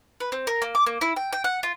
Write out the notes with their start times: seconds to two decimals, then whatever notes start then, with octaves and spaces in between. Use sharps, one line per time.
0.20 B4
0.32 C4
0.47 A#4
0.62 A#3
0.75 D6
0.86 A#3
1.01 E4
1.16 G5
1.33 G5
1.44 F#5
1.63 F4